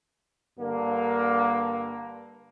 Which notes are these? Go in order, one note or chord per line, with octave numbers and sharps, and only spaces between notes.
G2 D3 A#3